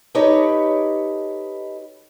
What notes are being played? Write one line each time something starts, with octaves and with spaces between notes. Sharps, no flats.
D#4 G4 A4 B4 C#5 D#5